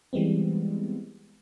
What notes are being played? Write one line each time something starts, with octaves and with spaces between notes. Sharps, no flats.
E3 G3 G#3 B3 C4